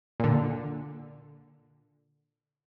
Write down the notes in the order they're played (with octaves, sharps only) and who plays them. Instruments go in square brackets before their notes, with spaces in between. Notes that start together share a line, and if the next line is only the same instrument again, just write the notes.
[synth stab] A#2 D3